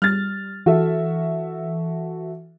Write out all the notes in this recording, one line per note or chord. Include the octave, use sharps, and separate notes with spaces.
G3 F6 A6
E3 F#4 A4 E5